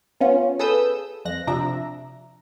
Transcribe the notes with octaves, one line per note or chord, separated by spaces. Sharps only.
B3 C#4 F4
G#4 A4 B4 D#6 E6 G6
F2 F#6 A#6
C3 F3 D4 E5 A#5 A#6